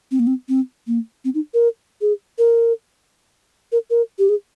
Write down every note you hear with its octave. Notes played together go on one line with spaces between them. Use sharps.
C4
A#3
C4
C4
A#3
C4
D#4
A#4
G#4
A#4
A#4
A#4
G4
G#4